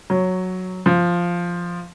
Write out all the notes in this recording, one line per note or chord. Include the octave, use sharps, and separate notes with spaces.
F#3
F3